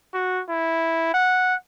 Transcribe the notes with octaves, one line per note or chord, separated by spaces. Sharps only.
F#4
E4
F#5